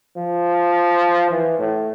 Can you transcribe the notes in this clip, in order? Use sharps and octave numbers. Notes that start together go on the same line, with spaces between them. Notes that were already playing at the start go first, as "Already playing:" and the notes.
F3
E3
A2